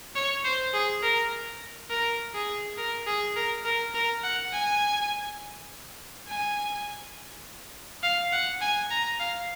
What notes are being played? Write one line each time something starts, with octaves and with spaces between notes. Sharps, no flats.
C#5
C5
G#4
A#4
A#4
G#4
A#4
G#4
A#4
A#4
A#4
F#5
G#5
G#5
F5
F#5
G#5
A#5
F5